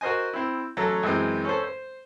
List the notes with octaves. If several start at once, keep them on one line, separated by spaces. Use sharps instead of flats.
F#4 A#4 C5 D#5 G#5
C4 E4
A1 F#3 C#4 A4 A#5
F#2 E3 G#3 C4
C#4 A4 C5
C5